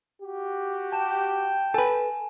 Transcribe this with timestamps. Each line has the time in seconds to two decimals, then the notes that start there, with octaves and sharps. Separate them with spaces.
0.22 F#4 G4
0.93 G5 A5 E7
1.74 A4 B4 G#5